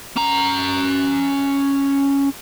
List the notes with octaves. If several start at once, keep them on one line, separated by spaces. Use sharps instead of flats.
C#4 A#5